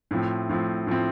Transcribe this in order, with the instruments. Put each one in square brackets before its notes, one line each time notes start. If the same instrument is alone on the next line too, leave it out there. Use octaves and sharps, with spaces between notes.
[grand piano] A2 F3 C4
A2 F3 C4
A2 F3 C4